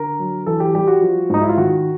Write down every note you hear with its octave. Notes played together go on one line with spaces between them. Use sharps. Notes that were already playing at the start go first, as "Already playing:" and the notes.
Already playing: D3 A#4
F#3
E3 A4
G4
G3 G4
F#4
F3
G#2 D#4
E4
F4
D#3 F#4